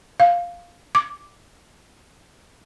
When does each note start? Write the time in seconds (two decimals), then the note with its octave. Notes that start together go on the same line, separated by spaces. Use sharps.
0.20 F5
0.95 D6